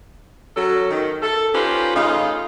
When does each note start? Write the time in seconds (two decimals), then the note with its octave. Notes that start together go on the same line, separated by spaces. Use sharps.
0.56 F#3 C#4 A4
0.91 D#3
1.22 A4
1.54 C#4 D#4 F4 G4 B4 C5
1.95 C#3 A3 D#4 F4 G#4 F5